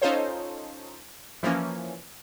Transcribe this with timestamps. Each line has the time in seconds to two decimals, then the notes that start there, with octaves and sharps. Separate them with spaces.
0.02 C#4 D#4 F4 A4 C5 C#5
1.43 E3 F3 A#3 C#4